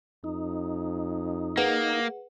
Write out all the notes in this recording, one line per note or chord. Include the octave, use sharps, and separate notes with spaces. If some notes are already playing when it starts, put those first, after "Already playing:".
F2 D#4
A#3 G#4 B4 F#5